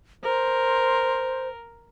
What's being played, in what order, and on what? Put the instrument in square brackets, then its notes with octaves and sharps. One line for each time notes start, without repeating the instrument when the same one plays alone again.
[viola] A#4 [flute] C5